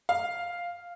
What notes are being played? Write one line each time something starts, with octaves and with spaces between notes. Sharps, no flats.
F5